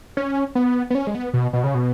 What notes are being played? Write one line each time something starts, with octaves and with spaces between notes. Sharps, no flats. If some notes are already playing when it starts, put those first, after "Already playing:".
C#4
B3
B3
C#4
G#3
B3
B2
B2
C#3
B2